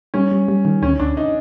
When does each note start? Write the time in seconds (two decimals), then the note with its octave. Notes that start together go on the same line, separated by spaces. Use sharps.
0.14 G3 C#4
0.31 G3
0.48 G3
0.65 D#3
0.82 D2 C#4
1.00 D2 D4
1.17 D#4